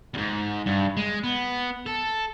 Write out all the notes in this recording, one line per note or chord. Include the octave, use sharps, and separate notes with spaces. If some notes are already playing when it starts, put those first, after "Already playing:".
E2 G#2
G2
G#3
B3
A4